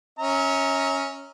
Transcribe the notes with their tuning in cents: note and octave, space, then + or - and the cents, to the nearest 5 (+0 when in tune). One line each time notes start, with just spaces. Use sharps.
C#4 +0 E5 -40 A#5 +0